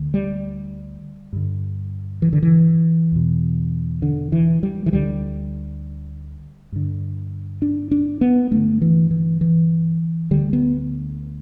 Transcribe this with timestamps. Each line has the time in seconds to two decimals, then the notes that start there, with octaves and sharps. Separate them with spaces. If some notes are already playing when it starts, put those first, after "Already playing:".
Already playing: D2 D3
0.14 G3
1.33 G2 D3
2.22 E3
2.33 D3
2.43 E3
3.12 E2 B2
4.02 D3
4.32 E3
4.63 G3
4.86 E3
4.92 D2 D3 G3
6.72 G2 D3
7.62 D4
7.91 D4
8.21 B3
8.51 G2 D3 A3
8.82 E3
9.11 E3
9.41 E3
10.31 D2 D3 G3
10.53 B3